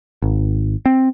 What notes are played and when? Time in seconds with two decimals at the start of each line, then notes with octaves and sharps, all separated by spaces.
0.22 G#1
0.86 C4